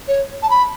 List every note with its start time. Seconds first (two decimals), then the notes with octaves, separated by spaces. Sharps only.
0.08 C#5
0.43 A5
0.50 B5